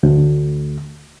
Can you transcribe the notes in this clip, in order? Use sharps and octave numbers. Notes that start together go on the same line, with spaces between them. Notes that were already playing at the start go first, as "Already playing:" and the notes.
D2